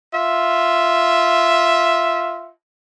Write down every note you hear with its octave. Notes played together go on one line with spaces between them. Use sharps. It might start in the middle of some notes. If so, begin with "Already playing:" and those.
F4 E5